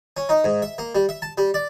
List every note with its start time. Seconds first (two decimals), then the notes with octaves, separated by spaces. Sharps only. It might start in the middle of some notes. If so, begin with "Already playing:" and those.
0.17 C#4
0.29 D#4
0.44 G#2
0.62 E5
0.78 A#3
0.95 G3
1.09 E5
1.22 A5
1.38 G3
1.54 D5